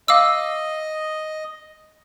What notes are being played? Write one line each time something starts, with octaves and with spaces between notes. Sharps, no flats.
D#5 F5 D6 E6